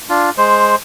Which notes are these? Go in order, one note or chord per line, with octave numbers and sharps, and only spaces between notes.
D4 F4
G#3 C5